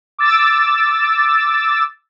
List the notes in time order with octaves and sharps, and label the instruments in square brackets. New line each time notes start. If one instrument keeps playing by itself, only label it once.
[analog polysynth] D6 E6 A6